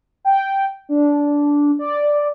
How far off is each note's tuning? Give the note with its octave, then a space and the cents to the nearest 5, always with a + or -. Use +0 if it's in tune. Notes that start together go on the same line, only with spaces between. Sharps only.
G5 -5
D4 -15
D5 +0